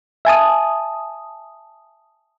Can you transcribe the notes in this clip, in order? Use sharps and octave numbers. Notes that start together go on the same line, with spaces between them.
E5 G#5 A5 D#6